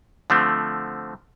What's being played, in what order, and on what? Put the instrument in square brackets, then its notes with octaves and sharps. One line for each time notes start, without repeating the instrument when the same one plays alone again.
[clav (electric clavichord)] D3 F3 A3 C4